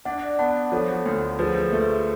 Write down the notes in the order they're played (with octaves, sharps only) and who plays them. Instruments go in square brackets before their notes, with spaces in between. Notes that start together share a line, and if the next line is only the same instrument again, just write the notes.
[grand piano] D4 [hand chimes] D5 F#5
[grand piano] B3 [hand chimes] F#5 A5
[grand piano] F3 [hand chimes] A4 C#5
[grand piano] D2
[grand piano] F3 [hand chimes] G#4 B4
[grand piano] A3